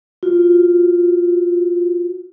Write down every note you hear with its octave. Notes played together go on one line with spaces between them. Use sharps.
F4 F#4